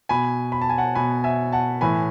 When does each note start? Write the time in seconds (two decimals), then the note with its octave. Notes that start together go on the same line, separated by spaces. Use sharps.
0.09 B2 G#5 B5
0.52 B5
0.61 A5
0.69 G#5
0.78 F#5 A5
0.95 B2 G#5 B5
1.24 E5 G#5
1.52 F#5 A5
1.81 A2 E3 G#5 B5